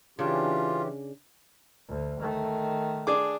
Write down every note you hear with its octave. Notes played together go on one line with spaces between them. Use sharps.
C#3 E3 C#4 D4 F4 G4
D2
D#3 A3
D4 G#4 D6